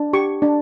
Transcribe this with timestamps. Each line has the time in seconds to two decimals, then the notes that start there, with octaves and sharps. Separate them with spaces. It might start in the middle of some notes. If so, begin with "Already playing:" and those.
Already playing: D4
0.13 G4 C#6
0.42 D4